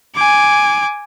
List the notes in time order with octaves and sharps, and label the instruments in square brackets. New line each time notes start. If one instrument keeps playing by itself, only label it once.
[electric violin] G#5 D6